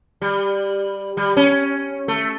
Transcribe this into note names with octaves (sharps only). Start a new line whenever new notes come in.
G3
G3
C#4
A3